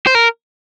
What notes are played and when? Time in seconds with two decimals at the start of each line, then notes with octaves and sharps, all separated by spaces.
0.07 C5
0.15 A#4